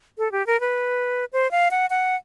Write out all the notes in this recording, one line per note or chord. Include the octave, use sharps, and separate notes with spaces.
A4
G4
A#4
B4
C5
F5
F#5
F#5